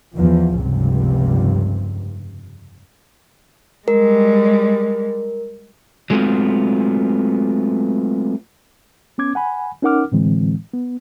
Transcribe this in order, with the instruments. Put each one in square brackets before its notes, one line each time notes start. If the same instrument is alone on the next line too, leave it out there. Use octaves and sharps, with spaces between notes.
[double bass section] E2 F3
F1 C#2 G2 C3
[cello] G3 G#3 [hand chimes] A#4
[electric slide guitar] F#3 G#3 A3 B3 C4 F4
[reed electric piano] B3 C#4 D6 G#6
F#5 G#5 B5
C#4 D#4 A#4 F#5 D6 F6
A2 D3 E3 G#3 C4
B3